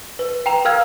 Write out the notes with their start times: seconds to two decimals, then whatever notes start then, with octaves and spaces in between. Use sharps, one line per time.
0.19 B4
0.46 G5 A#5 F7
0.65 A#4 F5 E6 F6 G#6